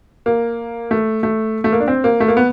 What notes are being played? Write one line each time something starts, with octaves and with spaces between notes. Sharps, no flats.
A#3
A3
A3
A3
A#3
D4
C4
A#3
A3
A#3
B3